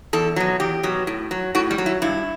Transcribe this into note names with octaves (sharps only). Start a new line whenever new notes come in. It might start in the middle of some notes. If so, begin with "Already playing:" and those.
E2 A4
B2 F#3
E2 G4
B2 F#3
A2
F#3
A2 F#4
G3
F#3
E4
G2 E4